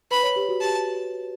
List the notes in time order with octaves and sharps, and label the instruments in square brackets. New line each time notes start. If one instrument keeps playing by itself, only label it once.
[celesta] B4 [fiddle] B5
[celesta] C#5
G4
F#4
[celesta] G4 [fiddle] A5